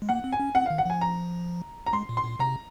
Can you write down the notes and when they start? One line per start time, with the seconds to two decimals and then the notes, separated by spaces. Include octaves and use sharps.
0.02 G#3
0.09 A#3 F#5
0.24 C4
0.33 G#5
0.40 C#4
0.55 C4 F#5
0.66 D#3 F5
0.78 F#5
0.86 F3 G#5
1.01 A#5
1.86 A#5
1.93 G#3 C6
2.09 A#2
2.17 C6
2.24 A#2
2.39 C3 A#5